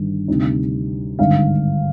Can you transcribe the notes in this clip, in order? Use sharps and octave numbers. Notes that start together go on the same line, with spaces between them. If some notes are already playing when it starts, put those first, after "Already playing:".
Already playing: G1 G2 D#3
D2 C3 G3 C4 D#4
G#1 G2 D3 F5